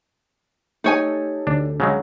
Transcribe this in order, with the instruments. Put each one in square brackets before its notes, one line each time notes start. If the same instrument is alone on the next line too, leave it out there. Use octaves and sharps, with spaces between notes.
[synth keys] A3 G4 A4 [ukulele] D#4 C#5 G#5
[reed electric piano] D2 [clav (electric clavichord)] D4
[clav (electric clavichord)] C#3 F#3 G#3